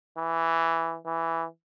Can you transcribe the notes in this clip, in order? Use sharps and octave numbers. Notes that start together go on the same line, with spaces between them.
E3
E3